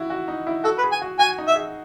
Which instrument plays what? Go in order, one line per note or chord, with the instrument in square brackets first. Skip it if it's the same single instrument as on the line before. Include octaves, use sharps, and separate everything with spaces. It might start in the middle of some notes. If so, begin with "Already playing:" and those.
Already playing: [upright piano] E4 F#4
F#4
D#4
E4
[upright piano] F#4 [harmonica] A4
[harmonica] B4
[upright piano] G#4
[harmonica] G#5
[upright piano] F#4
[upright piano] F#4 [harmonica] G#5
[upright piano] D#4
[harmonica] E5
[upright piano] G#4